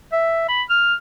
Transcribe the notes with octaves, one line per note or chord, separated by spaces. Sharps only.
E5
B5
F6